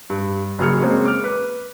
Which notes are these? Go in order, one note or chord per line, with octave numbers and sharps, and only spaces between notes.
G2
F#1 F#2 G#4 F6 C#7
G#3 A#3 C4 C#4
D6 F6
B4